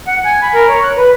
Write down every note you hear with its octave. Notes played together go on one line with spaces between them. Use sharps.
F#5
G#5
B5
A#4
C#5
F#6
B4